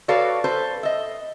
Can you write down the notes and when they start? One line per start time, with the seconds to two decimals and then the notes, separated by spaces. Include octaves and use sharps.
0.08 F#4 A4 B4 C#5 D5 F5
0.44 A4 B4 C5
0.83 D#5 E5